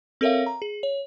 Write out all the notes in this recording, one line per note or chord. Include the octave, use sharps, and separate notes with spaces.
C4 A4 A#4 C#5 E5 F5
A#5
G#4
C#5